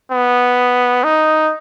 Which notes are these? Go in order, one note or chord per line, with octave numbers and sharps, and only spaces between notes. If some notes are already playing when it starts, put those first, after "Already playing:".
B3
D#4